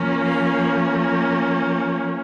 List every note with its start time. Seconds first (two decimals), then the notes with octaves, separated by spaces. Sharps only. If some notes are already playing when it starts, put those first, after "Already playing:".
Already playing: F3 A#3 C#4
0.22 F5